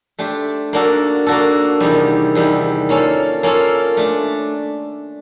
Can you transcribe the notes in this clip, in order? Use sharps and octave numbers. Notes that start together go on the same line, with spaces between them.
A3 D4 G4 C5
A#3 D4 F#4 A4
A#3 D4 F#4 A4
E2 C3 D#3 G3
E2 C3 D#3 G3
A#3 C#4 F4 A4
A#3 C#4 F4 A4
A3 D4